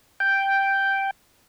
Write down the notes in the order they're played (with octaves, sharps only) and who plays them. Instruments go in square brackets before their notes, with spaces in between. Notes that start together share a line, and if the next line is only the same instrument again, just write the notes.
[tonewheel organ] G5